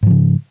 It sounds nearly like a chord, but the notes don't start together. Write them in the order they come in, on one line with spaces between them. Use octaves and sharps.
G#2 F3 C#3